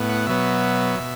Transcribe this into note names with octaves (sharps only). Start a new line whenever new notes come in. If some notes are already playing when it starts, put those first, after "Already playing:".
Already playing: A2 B3
F#5
B2 F#3 B3 E5
B2